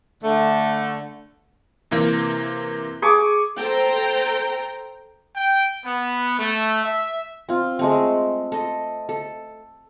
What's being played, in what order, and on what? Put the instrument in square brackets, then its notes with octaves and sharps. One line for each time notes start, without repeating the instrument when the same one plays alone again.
[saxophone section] D3 A3
[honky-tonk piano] C3 E3 A#3
[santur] G#4 C#6 D6
[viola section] A4 C5 G5 A#5
[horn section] G5
B3
A3
E5
[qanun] C4 F4
G#3 A3 C4
A4 D#5
A4